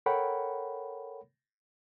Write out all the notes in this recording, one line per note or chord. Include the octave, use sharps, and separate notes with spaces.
A4 A#4 C#5 F#5 G5 B5